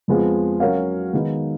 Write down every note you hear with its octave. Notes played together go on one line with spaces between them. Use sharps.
F2 F3 G#3 B3 F4
F#3 C#4 F#4 A#4 F5
D#3 G#3 B3 D#4